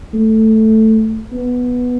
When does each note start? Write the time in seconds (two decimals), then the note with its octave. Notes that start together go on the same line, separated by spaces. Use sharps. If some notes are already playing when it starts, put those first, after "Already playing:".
0.14 A3
1.33 B3